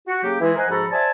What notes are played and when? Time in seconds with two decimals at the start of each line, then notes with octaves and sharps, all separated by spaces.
0.07 F#4
0.23 C#3 F#3 A#3 G4
0.40 E3 G#3 E4
0.56 A#4 C5 D#5 F#5 G#5
0.69 G#2 F3 F#4 A4 A#5 B5
0.91 C5 D5 E5 G#5 A5